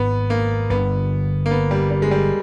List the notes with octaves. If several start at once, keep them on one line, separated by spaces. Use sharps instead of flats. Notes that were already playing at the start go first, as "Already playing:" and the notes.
Already playing: G#1 G#2 B3
A#3
G1 G2 D3 B3
A#3
B3
G3
G3
G#3
G3